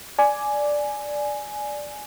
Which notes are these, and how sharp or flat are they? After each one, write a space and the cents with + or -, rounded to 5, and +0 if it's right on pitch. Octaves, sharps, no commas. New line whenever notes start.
D5 +0 G#5 +10